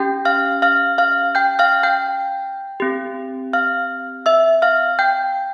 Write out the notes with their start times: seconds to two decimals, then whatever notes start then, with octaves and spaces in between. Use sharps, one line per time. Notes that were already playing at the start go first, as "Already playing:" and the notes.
Already playing: C#4 G4 G5 G6
0.25 F5 F6
0.62 F5 F6
0.98 F5 F6
1.35 G5 G6
1.59 F5 F6
1.83 G5 G6
2.80 C4 G4
3.53 F5 F6
4.26 E5 E6
4.62 F5 F6
4.99 G5 G6